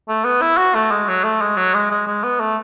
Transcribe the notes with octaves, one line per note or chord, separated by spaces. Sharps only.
A3
B3
E4
F#4
A3
G#3
F#3
A3
G#3
F#3
G#3
G#3
G#3
B3
A3